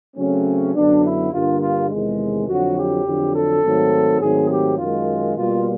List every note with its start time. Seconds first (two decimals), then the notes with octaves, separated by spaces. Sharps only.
0.16 C#3 F#3 A3 C4 C#4
0.74 F#2 D3 F#3 B3 D4
1.04 E4
1.32 G2 D3 G3 A#3 F4
1.61 F4
1.90 E2 C3 D#3 G#3
2.47 F2 D3 F#3 F#4
2.77 G4
3.05 F2 D3 F#3
3.34 A4
3.63 G#2 D#3 F#3 A3 C4
4.21 G#2 D#3 F#3 A3 C4 G#4
4.50 G4
4.78 F#2 D#3 G#3 F4
5.36 B2 G3 A#3 F4